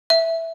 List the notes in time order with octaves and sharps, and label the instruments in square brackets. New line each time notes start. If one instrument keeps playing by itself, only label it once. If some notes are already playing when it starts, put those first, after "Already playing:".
[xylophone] E5